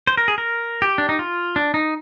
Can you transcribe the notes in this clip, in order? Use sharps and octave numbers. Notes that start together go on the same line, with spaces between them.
C5
A#4
G#4
A#4
G4
D4
D#4
F4
D4
D#4